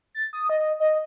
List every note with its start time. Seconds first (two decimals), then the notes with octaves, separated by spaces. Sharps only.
0.15 A6
0.33 D#6
0.49 D#5
0.80 D#5